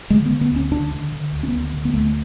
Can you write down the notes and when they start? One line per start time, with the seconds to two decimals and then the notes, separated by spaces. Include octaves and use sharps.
0.10 D3 G#3
0.26 B3
0.30 D3
0.41 B3
0.51 D2
0.56 C#4
0.71 D3 D4
0.92 D3
1.12 D3
1.32 D2
1.43 C#4
1.48 B3
1.53 D2
1.73 D3
1.85 B3
1.94 D2 A3